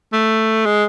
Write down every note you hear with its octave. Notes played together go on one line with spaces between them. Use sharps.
A3
G#3